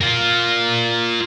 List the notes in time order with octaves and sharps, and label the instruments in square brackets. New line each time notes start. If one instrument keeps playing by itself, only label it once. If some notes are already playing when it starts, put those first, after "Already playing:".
[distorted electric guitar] F4 A#4